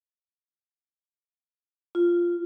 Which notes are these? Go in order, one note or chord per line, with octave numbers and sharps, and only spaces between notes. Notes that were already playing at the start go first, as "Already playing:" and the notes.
F4